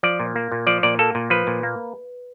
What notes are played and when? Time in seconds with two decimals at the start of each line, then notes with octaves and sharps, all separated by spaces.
0.03 F3 D5
0.20 A#2
0.36 A#3
0.52 A#2
0.67 F3 D5
0.83 A#2 D5
0.99 A#3 A4
1.15 A#2
1.30 F3 B4
1.47 A#2
1.63 A#3